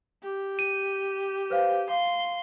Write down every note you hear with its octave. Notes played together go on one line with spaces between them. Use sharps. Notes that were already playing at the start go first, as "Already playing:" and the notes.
G4
D#7
B4 C5 F5
F5 C6